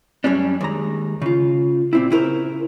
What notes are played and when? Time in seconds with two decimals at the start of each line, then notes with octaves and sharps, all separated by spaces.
0.24 F#2 G3 C#4 D4
0.61 D#2 G#3 A#5
1.22 C#3 F4
1.93 A#2 C4 E4
2.11 C#3 E4 F4 A#4 C5